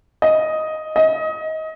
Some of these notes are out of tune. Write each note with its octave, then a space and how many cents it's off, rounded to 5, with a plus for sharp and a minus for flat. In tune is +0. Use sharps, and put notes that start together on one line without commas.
D#5 +5
D#5 +25